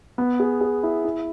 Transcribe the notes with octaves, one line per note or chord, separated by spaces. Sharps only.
B3
G#4
G#4
E4
E4